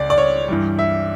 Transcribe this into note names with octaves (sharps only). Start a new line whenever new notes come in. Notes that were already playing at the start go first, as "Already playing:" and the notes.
Already playing: C#2 C#3 D5
D5
C#5
G2 E3 G3
E5